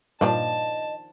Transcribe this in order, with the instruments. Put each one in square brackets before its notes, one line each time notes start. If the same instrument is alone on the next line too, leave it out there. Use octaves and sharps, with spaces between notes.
[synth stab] G2 A#2 [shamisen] D#3 F3 D4 [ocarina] D#5 [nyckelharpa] A5